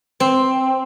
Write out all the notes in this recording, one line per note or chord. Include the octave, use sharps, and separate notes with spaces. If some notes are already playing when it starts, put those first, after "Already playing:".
C4